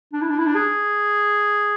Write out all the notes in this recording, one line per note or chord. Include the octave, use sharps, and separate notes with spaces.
D4
E4
D4
E4
D4
G#4